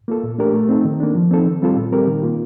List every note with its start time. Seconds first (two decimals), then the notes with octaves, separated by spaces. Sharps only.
0.08 A#3 F4 A4
0.23 A#2
0.38 A3 D4 G4 A#4
0.54 A3
0.69 C4 D#4 A4
0.85 D#3
1.00 A#3 D4
1.15 F3
1.31 C4 D#4 A4
1.46 D#3
1.62 G3 C4 F4 A4
1.76 A#2
1.92 G3 C4 G4 A#4
2.07 D#3
2.23 A#3 F4